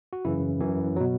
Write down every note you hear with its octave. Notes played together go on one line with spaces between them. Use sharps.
F#4
F#2 C#3 E3 E4
F#2 E3
F#3
B2